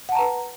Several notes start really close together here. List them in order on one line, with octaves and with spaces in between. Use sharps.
F#5 A5 A#5 B4